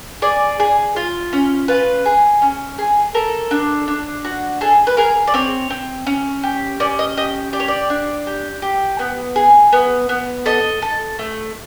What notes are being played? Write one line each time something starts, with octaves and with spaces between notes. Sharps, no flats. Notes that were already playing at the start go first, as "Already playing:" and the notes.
G#4 D5
G#4
F4
C#4
F4 B4
G#4
C#4
G#4
A4 A#4
D4
D4
F#4
G#4 A4
B4
G#4 A#4
D5
C4 C#5
C4
C#4
G4
C#4 D5
D#5
G4 D#5
G4 D5
C#5
D5
D4
G4
G4
B3
G#4
B3
B3
A4 D#5
A4
A3